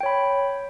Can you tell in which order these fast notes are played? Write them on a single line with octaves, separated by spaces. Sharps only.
G5 C#5 B5